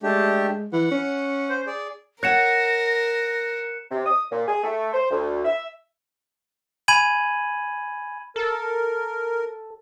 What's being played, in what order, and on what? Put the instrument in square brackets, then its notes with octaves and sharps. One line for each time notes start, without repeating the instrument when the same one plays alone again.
[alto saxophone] G#3 [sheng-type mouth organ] A3 D4 G4
[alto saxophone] E3 [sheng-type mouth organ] F#5
[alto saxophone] C#4
[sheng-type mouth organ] C5
G#4 D5
[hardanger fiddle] A#4 [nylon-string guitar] C#5 F#5 [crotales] F#6 C#7 E7 [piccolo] A#6
[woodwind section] C3
D#6
A#2
G#4
A3
C5
D2
E5
[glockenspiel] G#5 B5 G#6 D#7 F#7
[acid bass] A4 [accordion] A#4